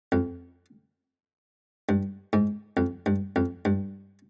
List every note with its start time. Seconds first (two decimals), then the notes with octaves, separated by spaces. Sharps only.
0.12 F2
1.89 G2
2.33 G#2
2.77 F2
3.06 G2
3.36 F2
3.65 G2